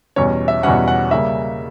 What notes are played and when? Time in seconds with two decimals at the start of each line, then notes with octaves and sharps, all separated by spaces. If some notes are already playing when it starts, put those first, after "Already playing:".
0.16 E2 B2 G3 C#4 C#5
0.48 E5
0.63 E2 B2 G3 C#4 F#5
0.88 F#5
1.11 C#3 G3 A#3 E5